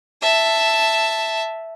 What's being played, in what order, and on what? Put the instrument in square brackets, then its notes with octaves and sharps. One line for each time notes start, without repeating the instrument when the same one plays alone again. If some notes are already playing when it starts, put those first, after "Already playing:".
[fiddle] E5 A5